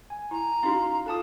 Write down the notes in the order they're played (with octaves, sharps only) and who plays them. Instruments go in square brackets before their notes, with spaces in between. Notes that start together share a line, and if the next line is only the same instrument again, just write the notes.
[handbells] G#5
[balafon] E4 [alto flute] A#5
[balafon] C#4 D#4 [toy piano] E4 F#4 [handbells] F5 C6
[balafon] F4 A4 [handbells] F5 A5 D#6